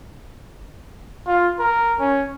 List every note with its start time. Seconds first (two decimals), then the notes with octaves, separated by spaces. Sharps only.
1.27 F4
1.59 A#4
1.99 C#4